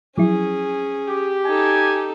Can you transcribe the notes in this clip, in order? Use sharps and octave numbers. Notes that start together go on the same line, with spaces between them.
F3 F#3 C#4 E4 G#4
G4
D#4 A4 G#5